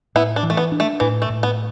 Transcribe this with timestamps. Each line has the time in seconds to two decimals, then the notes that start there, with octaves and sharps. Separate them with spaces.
0.15 A2 B3 E4
0.36 D4
0.43 E3
0.50 A3
0.57 B3
0.72 D4
0.80 A3
1.00 A2 E3
1.22 A3
1.30 A2
1.43 B3